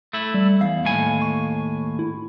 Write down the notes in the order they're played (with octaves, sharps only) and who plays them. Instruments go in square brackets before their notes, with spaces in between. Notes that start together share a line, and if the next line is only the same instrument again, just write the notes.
[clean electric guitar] A3 E4
[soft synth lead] G3
[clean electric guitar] E2 [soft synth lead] F5
[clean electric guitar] D#2 A2 G#5
[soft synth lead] C#6
E4